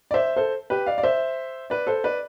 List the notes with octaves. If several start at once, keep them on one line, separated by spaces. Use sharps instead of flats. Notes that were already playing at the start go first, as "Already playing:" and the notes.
D5
C5 E5
A4 C5
G4 B4
D5 F5
D5
C5 E5
B4 D5
A4 C5
B4 D5